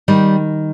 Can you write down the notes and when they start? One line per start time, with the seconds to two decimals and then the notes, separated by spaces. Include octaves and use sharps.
0.08 D#3 G3